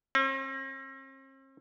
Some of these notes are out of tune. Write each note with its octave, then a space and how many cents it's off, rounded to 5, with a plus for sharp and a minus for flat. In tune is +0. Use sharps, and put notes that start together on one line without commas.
C4 +45